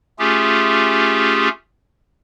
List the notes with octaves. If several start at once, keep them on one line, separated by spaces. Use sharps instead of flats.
A3 C#4 F4 G4 G#4